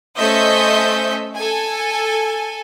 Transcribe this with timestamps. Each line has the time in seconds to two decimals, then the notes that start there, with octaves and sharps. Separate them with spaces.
0.18 A3 C#4 C5 D#5 E5 G6
1.36 A4 G#5